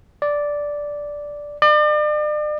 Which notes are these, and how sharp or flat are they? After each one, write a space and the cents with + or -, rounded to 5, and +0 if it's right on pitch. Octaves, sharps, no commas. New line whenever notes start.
D5 -5
D5 +40